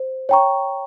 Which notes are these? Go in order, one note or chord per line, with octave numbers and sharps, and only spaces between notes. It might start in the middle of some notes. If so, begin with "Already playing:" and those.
Already playing: C5
C#5 G5 A#5 C#6